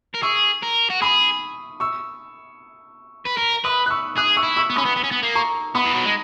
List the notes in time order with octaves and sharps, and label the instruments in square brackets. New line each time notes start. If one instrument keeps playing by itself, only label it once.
[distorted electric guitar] A#4
[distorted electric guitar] G#4 [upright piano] C#6 E6
[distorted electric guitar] A#4
F#4
[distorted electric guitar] G#4 [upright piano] B5 D#6
[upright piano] C#6 E6
[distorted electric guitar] B4
A#4
[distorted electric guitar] B4 [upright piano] B5 D#6
[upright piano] F#6
C#6 E6
[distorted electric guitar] G#4 [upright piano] D#6 F#6
[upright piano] C#6 E6
[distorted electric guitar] E4
[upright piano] C#6 E6
[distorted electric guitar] B3
[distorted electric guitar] C#4 [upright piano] B5 D#6
[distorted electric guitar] B3
B3
C#4
B3
A#3
[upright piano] A#5 C#6
[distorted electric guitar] B3 [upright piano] B5 D#6
[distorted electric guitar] E3
F#3
G#3